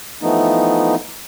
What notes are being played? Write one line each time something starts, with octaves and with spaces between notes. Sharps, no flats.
E3 F3 A3 B3 D#4